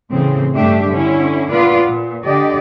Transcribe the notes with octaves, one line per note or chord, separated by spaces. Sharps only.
A2 C#3 E3 C4
G2 A3 D4 G4 E5
D3 C#4 E4
A#2 B3 F4 B4 D5
A#2
D3 G4 D5 D#5